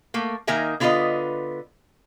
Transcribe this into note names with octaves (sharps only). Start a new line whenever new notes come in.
A3 A#3
D#3 A#3 D#4 A#4 E5 G#5
D3 B3 F4 A#4 B4 D#5